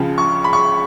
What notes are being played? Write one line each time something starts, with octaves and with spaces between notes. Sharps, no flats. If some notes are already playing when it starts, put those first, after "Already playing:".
Already playing: C#2 C#3 F3
C#6
B5
C#6